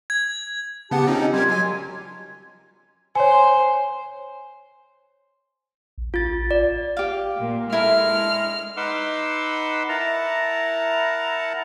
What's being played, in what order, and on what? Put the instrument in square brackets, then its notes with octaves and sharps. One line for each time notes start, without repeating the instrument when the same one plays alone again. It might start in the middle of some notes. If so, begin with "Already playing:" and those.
[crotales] G#6
[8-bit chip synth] C#3 B3 F#5 [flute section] G4 A5
[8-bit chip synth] C4 C#4 D#4 [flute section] F4
[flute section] D#5
[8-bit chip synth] G3 G4 A#4 [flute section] C6 G#6
[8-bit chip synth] F#3 G#5
[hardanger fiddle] C5 [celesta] C#5 G#5
[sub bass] A#1
[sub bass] A1 [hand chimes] F4 A6
[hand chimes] D5
[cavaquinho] G4 F5
[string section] A#2
[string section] G#3 [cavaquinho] E4 A4 A#4 [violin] F6
[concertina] D#4 B4 F#5 C6 D6 E6
E4 A#4 F#5 A5 A#5